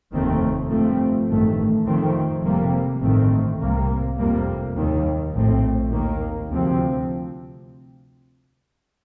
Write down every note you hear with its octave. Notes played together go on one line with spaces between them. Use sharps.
F1 D#2 D#3 A3 C4
G2 F3 A3 C4
A1 G2 D#3 A3
F2 D#3 A3 C4
F1 F2 C3 G3 A#3
A1 G2 D#3 A3 C4
C2 C3 G3 A#3
F1 F2 C3 G3 A#3
D#2 D#3 G3
A#1 A2 A3 C4
D#2 D#3 A#3
D2 C3 F3 C4